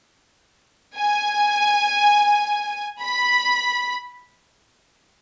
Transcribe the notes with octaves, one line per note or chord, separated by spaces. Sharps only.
G#5
B5